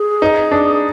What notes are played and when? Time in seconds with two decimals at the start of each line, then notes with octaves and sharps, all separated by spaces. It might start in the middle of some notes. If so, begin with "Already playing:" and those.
Already playing: G#4
0.22 D#4
0.51 D4